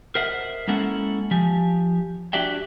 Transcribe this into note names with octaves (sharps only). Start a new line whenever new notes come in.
A#4 C5 D#5 E5 F#5
G#3 A#3 C#4 E4 A4 F#5
F3 G4 G#5
D4 F#4 G4 D5 E5 G5